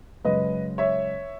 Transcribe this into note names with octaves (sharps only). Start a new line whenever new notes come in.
F#2 C#3 G#3 B4 D#5
C#5 E5